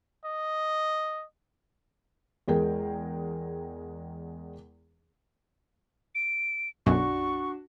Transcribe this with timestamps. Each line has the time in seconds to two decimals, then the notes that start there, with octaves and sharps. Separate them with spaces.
0.25 D#5
2.48 E2 G#3 G#4 A#4 G5
6.15 D7
6.86 B1 F#2 D4 F#4 C#6